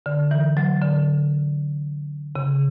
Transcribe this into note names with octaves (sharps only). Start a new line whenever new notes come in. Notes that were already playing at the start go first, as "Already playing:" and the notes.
D3
E3
F#3
D3
C#3